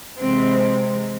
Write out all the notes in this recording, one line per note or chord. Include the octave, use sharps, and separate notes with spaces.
C3 E3 G#3 C4